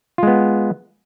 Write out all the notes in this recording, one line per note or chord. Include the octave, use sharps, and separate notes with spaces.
G#3 B3 F4